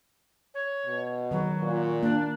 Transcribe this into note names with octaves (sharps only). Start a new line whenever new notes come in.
C#5
B2
D#3 F#3
A#2
A#3 D4